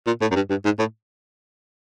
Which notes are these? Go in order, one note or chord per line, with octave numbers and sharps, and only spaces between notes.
A#2
A2
F#2
G2
G2
G#2
A2